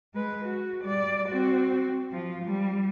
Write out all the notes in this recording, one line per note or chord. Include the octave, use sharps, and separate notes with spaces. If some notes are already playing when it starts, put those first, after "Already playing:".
G#3 B4
F#4
G3 D5
C4 F#4
F3 F4
G3